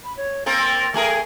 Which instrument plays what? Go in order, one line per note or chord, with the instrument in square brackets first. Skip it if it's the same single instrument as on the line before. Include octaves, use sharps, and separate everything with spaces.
[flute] B5
C#5
[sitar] A#3 C4 A#4 [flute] A6
[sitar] A3 G#4 A#4 [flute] G5